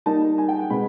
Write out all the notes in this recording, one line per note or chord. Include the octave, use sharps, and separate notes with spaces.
D#3 G3 A#3 D#4 A5
G#5
G5
F#5
B2 G#3 C4 B5